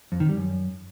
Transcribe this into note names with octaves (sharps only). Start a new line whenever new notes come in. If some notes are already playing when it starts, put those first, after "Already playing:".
F2
D#3
G3
F#2